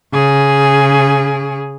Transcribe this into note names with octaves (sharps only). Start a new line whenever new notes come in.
C#3 G#4